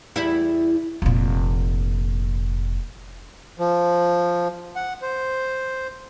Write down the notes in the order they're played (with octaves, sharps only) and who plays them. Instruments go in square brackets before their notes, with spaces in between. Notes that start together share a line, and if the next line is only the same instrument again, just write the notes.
[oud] E2 G3 E4
[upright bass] F1 A#2
[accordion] F3
F#5
C5